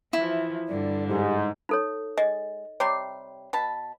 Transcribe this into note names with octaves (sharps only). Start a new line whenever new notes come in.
E3 F3 E4 E5
G2 D3 D5
G#2 G4
D#4 A4 C#5
G#3 D#5
C3 G3 C#5 C6
B2 A5 B5